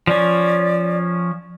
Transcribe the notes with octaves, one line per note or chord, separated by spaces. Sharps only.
F3 C#4 D5